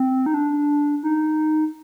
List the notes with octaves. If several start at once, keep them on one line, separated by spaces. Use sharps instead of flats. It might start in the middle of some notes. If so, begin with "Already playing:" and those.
Already playing: C4
D#4
D4
D#4